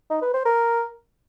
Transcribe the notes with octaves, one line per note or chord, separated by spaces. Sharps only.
D#4
B4
C5
A#4